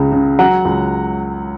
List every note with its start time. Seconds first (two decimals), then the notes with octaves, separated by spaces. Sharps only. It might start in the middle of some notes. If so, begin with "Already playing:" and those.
Already playing: C#2 C#3
0.12 C#3
0.39 F#3 F#5 A#5
0.65 C#2